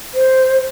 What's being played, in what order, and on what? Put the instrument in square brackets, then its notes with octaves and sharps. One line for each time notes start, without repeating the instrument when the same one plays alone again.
[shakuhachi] C5